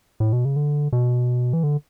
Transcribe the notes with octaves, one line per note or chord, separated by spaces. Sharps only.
A2
B2
C#3
D3
B2
E3
D3